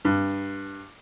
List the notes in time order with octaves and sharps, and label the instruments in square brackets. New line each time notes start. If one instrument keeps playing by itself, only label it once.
[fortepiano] G2